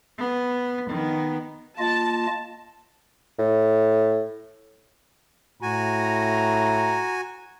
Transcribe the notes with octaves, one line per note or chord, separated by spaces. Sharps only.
B3
D#3 B3
A#3 F4 D#5 A5
A2
A2 F#4 G#5 A#5